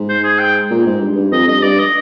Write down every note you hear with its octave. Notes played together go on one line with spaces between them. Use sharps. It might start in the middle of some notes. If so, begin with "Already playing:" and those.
Already playing: G#2
C5
G#4
G5
A#2
G#2
G2
G2
F2 D#5
G2 D#5
G2 D5
D#5